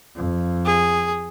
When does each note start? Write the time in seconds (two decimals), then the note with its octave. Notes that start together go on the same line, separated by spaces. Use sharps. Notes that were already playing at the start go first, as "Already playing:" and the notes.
0.16 F2
0.65 G#4